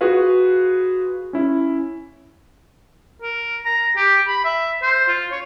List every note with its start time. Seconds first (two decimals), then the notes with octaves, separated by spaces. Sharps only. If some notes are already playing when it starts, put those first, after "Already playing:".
0.01 F4 F#4 G#4 B4 F5
1.33 C#4 E4
3.22 A#4
3.66 A#5
3.97 G4
4.28 B5
4.45 E5
4.83 C5
5.08 F4
5.31 C#5